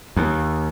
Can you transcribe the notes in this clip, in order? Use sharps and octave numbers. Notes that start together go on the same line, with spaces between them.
D#2